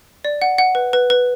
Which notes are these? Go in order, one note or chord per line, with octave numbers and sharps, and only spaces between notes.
D5
F#5
F#5
B4
B4
B4